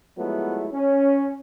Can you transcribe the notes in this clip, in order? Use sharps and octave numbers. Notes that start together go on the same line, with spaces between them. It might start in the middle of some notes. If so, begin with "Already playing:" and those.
F3 F#3 G#3 A3 B3 E4
C#4